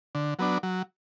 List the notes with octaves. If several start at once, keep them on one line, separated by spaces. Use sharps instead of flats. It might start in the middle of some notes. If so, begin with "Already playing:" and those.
D3
F#3 B3 D4
F#3